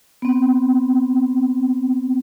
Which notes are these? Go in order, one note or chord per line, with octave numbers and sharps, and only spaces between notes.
B3 C4